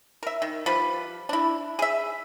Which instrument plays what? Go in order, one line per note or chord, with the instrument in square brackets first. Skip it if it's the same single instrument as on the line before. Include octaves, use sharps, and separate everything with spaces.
[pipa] A#4 E5
D#3
F3 G3 B4
D4 E4
G#4 E5